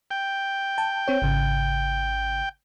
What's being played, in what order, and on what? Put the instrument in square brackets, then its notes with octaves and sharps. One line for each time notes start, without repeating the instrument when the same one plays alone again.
[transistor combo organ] G5
[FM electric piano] A5
C4 C#5
G#1 C#3